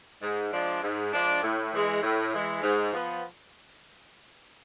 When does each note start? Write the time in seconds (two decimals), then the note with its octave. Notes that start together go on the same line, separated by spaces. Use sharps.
0.22 G#2
0.52 F3 G#3 D4
0.82 G#2
1.13 F3 G#3 D4
1.43 A2
1.72 E3 G#3
2.02 A2
2.33 E3 G#3
2.63 G#2
2.92 F3 B3